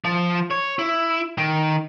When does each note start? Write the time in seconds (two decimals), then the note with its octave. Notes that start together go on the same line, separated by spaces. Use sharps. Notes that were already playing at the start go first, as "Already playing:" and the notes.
0.05 F3
0.51 C#5
0.79 E4
1.38 D#3